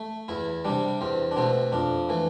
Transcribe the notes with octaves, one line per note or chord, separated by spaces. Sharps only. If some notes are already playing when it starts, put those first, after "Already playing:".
Already playing: A3
E2 E4
C3 G3 D4
E2 C4
D4
B2 A3 C4
F2 D4
E3 A3